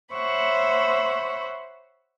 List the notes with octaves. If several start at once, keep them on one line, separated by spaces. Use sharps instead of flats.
C5 C#5 E5 F#5 B5 C#6